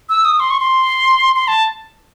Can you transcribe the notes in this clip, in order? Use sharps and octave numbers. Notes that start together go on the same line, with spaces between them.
E6
D#6
C6
C#6
C6
C6
A5